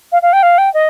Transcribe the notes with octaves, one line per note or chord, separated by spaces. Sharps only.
F5
F5
G5
F5
G5
D#5